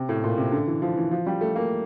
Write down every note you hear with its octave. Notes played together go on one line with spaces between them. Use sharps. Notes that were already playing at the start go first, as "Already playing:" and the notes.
Already playing: C3
A2
A#2
C3
D3
E3
F3
E3
F3
G3
A3
A#3